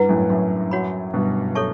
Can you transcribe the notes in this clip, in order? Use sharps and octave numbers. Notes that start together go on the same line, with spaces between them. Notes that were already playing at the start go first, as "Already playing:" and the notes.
Already playing: G2 C#4 E4 B4 F#5
F#2 A2
F#2 A2
F#4 C#5 F#5 B5
G2 B2
A4 C#5 E5 A5 C#6